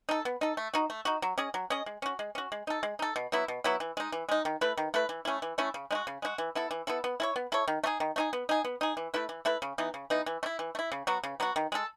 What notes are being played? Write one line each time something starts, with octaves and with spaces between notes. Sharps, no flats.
D#4 A4
B3
D#4 A4
A3
D#4 F#4
A3
D#4 F#4
F#3
C#4 G#4 D#5
F#3
C#4 G#4 D#5
G#3
C#4 F#4
G#3
C#4 F#4
G#3
D#4 A4
G#3
D#4 A4
B2
F#3 B3 E4
B2
F#3 B3 E4
E3
G#3 D#4
E3
G#3 D#4
D#3
A3 E4 B4
D#3
A3 E4 B4
E3
A3 C#4 E4
E3
A3 C#4 E4
C#3
G#3 D#4 F#4
C#3
G#3 D#4 F#4
E3
B3 E4 A4
E3
B3 E4 A4
B3
E4 A4 C#5
B3
E4 A4 C#5
D#3
A3 D#4 G#4
D#3
A3 D#4 G#4
B3
D#4 G#4
B3
D#4 G#4
E3
A3 E4 B4
E3
A3 E4 B4
C#3
E3 B3 D#4
C#3
E3 B3 D#4
E3
A3
E4
E3
A3
E4
C#3
F#3 B3 F#4
C#3
F#3 B3 F#4
D#3
G#3 D#4 A4